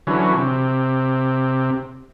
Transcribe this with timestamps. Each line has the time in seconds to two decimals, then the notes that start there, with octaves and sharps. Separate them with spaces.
0.07 D3 E3 F#3 C#4
0.37 C3